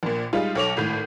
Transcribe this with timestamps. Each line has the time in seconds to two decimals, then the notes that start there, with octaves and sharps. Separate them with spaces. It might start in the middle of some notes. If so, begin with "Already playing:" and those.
0.03 A#1 A#2
0.33 G3 G#3 D#4 F4
0.55 B1 A4 C#5 D6 F7
0.77 G#1 A2 G6